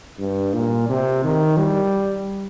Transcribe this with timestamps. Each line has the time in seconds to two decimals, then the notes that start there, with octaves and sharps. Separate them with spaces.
0.19 G2
0.54 A#2
0.89 C3
1.24 D#3
1.57 G3